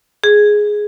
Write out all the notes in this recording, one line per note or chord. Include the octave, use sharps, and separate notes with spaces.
G#4